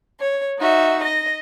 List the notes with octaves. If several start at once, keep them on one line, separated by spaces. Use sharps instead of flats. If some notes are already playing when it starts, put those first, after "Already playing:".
C#5
D#4 F#4 E5
D#5 A#6